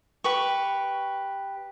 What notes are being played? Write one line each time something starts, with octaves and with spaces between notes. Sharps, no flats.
G4 B4 C#6